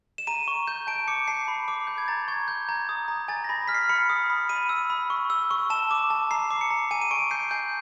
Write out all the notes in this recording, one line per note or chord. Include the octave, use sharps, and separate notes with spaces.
E7
A#5 D#7
C#6
G6
A5 D7
D6 C#7
A5 C7
B5
D6
B5 G6
G#6
A#5 A6
C#6 G#6
G6
A#5 G#6
D#6
A#5
G#5 A6
A#6
B5
F6 B6
C7
B5 C#7
D#6
B5
B5 D#7
E6
B5
C#6
E6
C#6
A5 E7
D6
A5
A#5 C7
D6
C#7
A#5
G#5 D#7
D#7
C#6 D7
G6 C7
G#5 G6